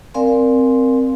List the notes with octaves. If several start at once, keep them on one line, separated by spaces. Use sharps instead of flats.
C4 A#4 D5 F5 G#5 C6